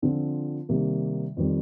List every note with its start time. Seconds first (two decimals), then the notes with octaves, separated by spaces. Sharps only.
0.02 D3 F3 C4 F4
0.69 C3 D#3 G3 A#3
1.37 F2 D#3 G3 C4